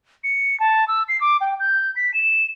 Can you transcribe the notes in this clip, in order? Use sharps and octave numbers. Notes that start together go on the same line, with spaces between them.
C#7
A5
E6
C7
D6
G5
G6
B6
E7